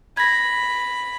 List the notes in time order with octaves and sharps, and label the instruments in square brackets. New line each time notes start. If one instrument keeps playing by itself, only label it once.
[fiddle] B5 [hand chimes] G#6 A#6